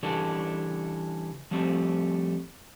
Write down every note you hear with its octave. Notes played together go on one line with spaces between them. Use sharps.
C#3 E3 G3 D4 A4
F3 G3 A3 C4